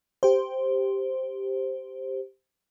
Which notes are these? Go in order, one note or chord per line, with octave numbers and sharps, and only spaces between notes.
G4 C5